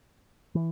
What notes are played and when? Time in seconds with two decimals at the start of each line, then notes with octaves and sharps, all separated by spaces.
0.55 E3